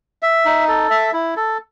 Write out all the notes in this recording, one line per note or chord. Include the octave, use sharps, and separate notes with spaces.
E5
D#4
A4
E5
E4
A4